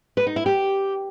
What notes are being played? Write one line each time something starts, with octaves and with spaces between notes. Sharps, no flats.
B4
D#4
E4
G4